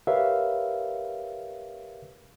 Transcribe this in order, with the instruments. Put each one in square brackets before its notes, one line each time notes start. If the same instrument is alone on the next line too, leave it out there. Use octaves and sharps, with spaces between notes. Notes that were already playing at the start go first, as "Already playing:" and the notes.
[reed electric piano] G4 A#4 B4 C#5 E5 F5